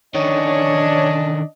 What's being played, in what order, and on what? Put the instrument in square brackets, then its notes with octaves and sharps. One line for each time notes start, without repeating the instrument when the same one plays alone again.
[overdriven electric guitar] D3 D#3 [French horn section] C#4 D4 [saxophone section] C#5 [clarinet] D#5